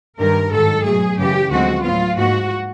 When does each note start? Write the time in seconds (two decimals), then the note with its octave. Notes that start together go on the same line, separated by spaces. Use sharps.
0.19 G2 D#3 G3 A#4
0.51 G#2 D#3 F#3 A4
0.84 B2 F#3 A3 G#4
1.17 F#2 C#3 E3 G4
1.50 D2 D3 F3 G#3 C4 F#4
1.83 A2 F#3 B3 F4
2.16 G#2 F3 A#3 F#4